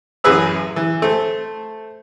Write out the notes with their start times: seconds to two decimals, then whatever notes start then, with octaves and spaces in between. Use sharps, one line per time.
0.24 A1 F#2 E4 G#4 B4 E6
0.76 E3
1.02 A3 C5